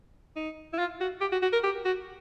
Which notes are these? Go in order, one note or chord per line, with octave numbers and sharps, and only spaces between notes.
D#4
E4
F4
F#4
G4
F#4
F#4
A#4
G4
F#4